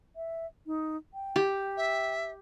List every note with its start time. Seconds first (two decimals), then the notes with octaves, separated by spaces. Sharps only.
0.16 E5
0.66 D#4
1.14 G5
1.36 G4
1.77 E5